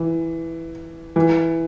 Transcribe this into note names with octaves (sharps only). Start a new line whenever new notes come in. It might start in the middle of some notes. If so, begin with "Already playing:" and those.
Already playing: E3
E3